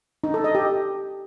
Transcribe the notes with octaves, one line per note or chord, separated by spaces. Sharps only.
D#4
A4
D#5
G4